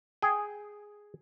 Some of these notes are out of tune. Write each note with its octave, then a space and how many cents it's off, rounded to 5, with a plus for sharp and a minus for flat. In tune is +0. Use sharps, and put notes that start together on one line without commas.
G#4 +0 G5 +0